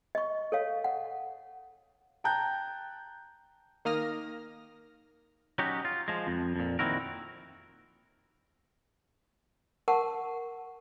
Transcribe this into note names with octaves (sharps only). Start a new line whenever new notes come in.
D#5 C#6
A4 C#5 F5
F#5
G5 A5 A#5 F#6 G6
D#3 A#3 D#6 F6 A#6
F#3 C#4 D#4 F#4 G4
F4
F3 G#3
F2
F2 A#2
A#2 D#3 C4 E4 F#4 A#4
A#4 F#5 A5 C#6